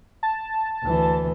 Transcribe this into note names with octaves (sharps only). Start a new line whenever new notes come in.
A5
D2 E3